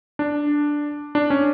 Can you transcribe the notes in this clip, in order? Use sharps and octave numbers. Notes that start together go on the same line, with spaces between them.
D4
D4
C#4